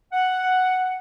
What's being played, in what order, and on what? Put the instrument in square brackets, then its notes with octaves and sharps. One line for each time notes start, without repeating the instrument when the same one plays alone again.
[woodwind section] F#5